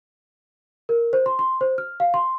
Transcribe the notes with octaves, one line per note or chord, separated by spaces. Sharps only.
A#4
C5
C6
C6
C5
F6
F5
C6